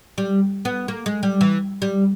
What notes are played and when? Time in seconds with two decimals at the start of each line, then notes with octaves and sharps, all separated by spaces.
0.18 G3
0.65 B3
0.88 A#3
1.06 G#3
1.23 G3
1.41 E3
1.82 G3